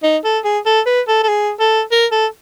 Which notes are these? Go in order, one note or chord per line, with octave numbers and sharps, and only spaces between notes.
D#4
A4
G#4
A4
B4
A4
A4
G#4
A4
A#4
A4